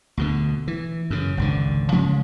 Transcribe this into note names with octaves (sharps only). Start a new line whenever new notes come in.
D2 B2 D3
E3
F#2 C#3
G#1 C#2 D3
C#3 F3 G#3 C#4